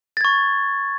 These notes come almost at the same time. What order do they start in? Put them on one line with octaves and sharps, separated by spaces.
A6 G#6 C#6